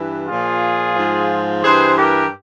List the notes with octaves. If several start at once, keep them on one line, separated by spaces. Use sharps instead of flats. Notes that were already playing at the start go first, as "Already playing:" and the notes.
Already playing: G2 E3
A#2 F3 F4 G#4
G#2 F3
G2 E3 G#4 C5
G4 A#4